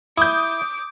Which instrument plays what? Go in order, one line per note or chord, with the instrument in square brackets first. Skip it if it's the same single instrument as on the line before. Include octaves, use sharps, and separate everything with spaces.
[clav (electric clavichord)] E4 [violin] D6 [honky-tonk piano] D#6 G6